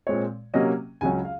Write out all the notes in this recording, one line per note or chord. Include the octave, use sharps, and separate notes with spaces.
A#2 G#3 C4 C#5
C3 F#3 A#3 C#4 D#5
C#2 C#3 F#3 C#4 G#5
F5